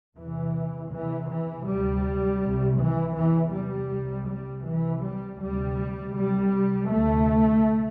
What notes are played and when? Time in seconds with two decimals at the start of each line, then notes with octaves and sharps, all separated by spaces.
0.18 E2 C3 E3
0.93 E2 C3 E3
1.31 E3
1.67 D2 C3 G3
2.42 C2 C3
2.80 E3
3.17 E2 C3 E3
3.54 G3
3.92 C2 C3
4.30 G3
4.66 C2 C3 E3
5.04 G3
5.42 D2 C3 G3
6.16 C2 C3 G3
6.92 D2 C3 A3